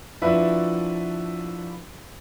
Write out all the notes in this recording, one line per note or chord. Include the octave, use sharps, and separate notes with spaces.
F3 D4 E4 F#4 B4 E5